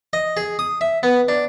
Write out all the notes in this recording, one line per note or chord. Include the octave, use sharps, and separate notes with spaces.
D#5
G#4
D#6
E5
B3
D4